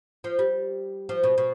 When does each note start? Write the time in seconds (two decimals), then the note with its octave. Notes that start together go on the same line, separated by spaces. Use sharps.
0.24 F3
0.39 G3
1.09 F3
1.23 B2
1.38 B2